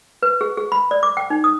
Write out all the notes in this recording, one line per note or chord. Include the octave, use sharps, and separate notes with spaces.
B4
G#4
G#4
B5
D5
D6
G5
D#4
D#6